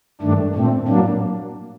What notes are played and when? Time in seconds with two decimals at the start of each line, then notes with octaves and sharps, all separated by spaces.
0.21 G2 D#3 A3 D4
0.55 A#2 A3 C4
0.87 A2 F#3 A#3 D4